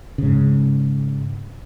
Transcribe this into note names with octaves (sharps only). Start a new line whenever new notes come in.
G#2 C#3